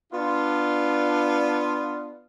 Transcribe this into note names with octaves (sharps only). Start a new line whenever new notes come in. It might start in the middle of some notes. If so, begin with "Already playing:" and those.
B3 D4 F4